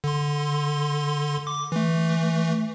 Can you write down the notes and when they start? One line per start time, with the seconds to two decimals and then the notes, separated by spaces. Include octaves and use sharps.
0.04 D3 C6
1.47 D6
1.72 E3 A3